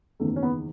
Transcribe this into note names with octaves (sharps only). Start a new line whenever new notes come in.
F#1 E2 D#3 A3
C#4
B3